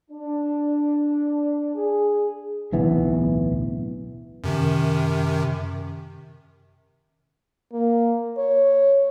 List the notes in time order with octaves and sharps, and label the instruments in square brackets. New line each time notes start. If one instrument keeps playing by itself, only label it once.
[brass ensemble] D4
G#4
[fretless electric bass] D1 B1 E3 B3
[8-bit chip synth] F#2 C3 D#3
[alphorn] A#3
C#5